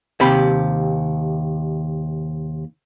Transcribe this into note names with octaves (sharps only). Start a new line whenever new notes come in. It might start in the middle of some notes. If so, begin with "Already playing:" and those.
D#2 C3 G4 B5